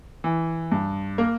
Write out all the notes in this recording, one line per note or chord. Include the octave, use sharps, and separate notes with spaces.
E3
G2
A#3